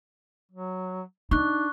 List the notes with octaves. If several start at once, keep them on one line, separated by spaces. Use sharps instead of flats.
F#3
D4 D#4 C#6 F#6